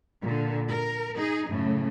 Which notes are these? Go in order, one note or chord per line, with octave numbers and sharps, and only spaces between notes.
A#2 D3
A#4
D#4 G#4
F#2 A2 C#3